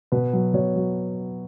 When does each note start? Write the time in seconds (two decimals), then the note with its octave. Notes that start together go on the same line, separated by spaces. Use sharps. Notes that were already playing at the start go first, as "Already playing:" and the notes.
0.12 B2 B4
0.33 F#3
0.54 B2 C#5
0.76 F#3